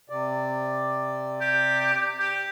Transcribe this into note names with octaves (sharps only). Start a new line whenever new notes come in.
C3 D5
G4
G4